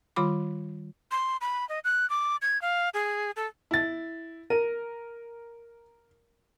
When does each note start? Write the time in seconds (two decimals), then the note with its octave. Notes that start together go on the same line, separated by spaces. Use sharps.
0.16 D#3 G3 F4 B5 D6
1.11 C6
1.41 B5
1.69 D#5
1.84 F#6
2.10 D6
2.42 G#6
2.62 F5
2.94 G#4
3.37 A4
3.71 E4 A6
4.50 A#4 D#7